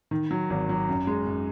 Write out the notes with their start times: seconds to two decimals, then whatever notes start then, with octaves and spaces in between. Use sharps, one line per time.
0.11 D#3
0.31 F#3
0.50 G#1
0.69 F#3
0.88 F#2
1.07 G#3
1.27 F#2